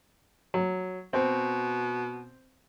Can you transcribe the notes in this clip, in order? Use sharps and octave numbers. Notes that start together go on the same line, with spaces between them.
F#3
B2 C4